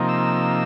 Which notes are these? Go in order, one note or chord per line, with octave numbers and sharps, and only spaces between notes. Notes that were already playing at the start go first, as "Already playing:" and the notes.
Already playing: C3 F3 A#3 D#4
E6